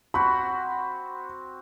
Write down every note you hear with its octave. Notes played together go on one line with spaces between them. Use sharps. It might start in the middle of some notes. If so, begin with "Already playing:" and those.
C4 F#4 B5